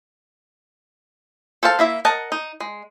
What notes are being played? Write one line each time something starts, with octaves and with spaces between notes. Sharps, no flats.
A4 C5 F5 A5
A#3 E4 E5
A#4 D#5 F#5 A5
D#4
G#3